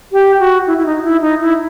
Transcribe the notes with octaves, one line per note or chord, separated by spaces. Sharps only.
G4
F#4
E4
E4
D#4
E4
D#4
E4